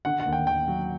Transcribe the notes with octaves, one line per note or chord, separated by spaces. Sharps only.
D3 F#5
F#5
D#2
G5
D#2 G5
F#3